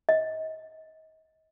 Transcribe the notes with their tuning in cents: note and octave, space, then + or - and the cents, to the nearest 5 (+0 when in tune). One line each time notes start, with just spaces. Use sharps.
D#5 +30